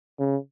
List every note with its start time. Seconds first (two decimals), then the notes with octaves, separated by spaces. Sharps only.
0.20 C#3